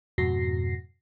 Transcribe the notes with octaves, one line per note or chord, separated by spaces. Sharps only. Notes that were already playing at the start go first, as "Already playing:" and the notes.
F2 G#2 B2 F#4 A#6 C7